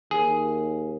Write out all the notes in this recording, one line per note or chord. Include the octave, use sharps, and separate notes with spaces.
D#2 G#4